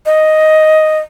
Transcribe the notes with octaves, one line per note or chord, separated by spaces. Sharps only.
D#5